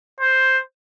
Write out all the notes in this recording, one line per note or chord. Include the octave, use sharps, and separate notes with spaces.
C5